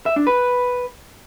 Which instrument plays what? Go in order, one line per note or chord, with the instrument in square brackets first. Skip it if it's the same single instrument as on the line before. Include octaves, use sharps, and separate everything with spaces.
[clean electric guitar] E5
D4
B4